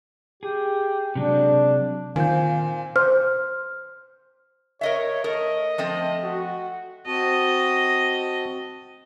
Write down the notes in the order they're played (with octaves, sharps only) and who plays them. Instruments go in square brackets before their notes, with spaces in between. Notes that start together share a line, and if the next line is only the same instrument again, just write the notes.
[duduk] G4 [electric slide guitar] G#4
[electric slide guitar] C3 F#3 G#3 [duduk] D4
[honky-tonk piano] A#2 C4 [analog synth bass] D#3 [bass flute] F5 [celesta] G#5 G6
[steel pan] C5 [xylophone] F6
[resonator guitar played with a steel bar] A#4 D#5 E5 [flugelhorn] C#5
[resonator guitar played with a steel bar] A3 A#4 [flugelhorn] D#5
[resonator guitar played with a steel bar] F3 A3 C4
[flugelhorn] F#4
[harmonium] C4 F#4 A5 [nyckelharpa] D#5